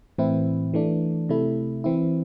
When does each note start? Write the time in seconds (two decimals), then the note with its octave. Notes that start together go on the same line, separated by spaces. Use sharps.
0.18 A2 E3 C4 E4
0.74 E3 A3 D4
1.29 C3 A3 E4
1.84 E3 C4 E4